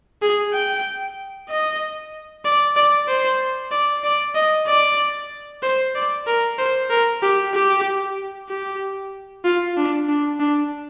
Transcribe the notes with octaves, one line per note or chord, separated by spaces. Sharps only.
G#4
G5
D#5
D5
D5
C5
D5
D5
D#5
D5
C5
D5
A#4
C5
A#4
G4
G4
G4
F4
D4
D4
D4